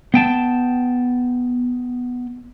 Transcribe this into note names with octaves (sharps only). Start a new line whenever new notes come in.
B3 G5 A5